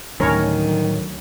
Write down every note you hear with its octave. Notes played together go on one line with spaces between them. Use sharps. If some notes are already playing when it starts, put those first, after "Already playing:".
D2 A2 D#3 F#3 G3 C#4 A#4 C#5